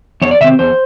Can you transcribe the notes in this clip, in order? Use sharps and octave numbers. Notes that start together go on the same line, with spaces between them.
E2 C#5
D5
C3 D#3 C4 E5
E2 C5